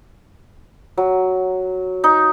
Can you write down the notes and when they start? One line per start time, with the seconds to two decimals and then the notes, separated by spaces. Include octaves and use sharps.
0.97 F#3
2.04 D#4